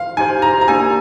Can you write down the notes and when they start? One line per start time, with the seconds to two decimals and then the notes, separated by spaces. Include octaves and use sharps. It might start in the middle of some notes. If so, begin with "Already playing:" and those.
Already playing: F5
0.17 D#4 G4 C5 G#5
0.42 A#5
0.61 A#5
0.68 A#3 D4 G4 G#5